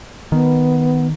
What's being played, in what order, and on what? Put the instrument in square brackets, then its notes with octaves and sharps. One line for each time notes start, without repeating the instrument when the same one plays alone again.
[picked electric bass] D#3 [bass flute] B3